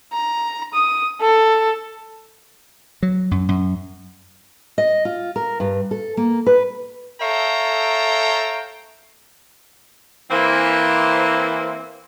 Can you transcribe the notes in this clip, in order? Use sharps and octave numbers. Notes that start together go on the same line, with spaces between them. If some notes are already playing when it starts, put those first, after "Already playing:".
A#5
D#6
A4
F#3
F#2
F#2
D#5
F4
A#4
G2
A4
A#3
B4
A4 C#5 E5 F5 G5 A#5
E3 A#3 C4